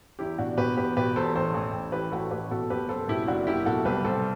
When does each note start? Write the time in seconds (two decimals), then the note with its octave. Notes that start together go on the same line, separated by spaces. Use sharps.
0.19 E2 E4 G4
0.38 B2 D4 F#4
0.57 B2 G4 B4
0.77 E2 G4 B4
0.97 B2 G4 B4
1.16 E2 A4 C5
1.35 A1 A4 C5
1.54 A1
1.74 A1
1.92 E3 G4 B4
2.12 A1 F#4 A4
2.31 A1 G4 B4
2.51 B2 F#4 A4
2.70 F#1 G4 B4
2.89 F#1 A4 C5
3.08 B2 E4 G4
3.27 F#1 D4 F#4
3.47 F#1 E4 G4
3.66 B2 F#4 A4
3.85 C2 G4 B4
4.05 C2 A4 C5